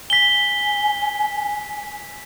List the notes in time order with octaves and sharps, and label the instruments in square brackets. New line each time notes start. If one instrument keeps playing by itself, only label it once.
[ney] G#5 [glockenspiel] B6 G7